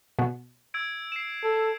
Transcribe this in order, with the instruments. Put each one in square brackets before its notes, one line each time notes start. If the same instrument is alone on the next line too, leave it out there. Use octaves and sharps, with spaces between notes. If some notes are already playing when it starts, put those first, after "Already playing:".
[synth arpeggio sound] B2 B3
[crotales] E6 G#6 D7
C7 E7
[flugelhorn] A4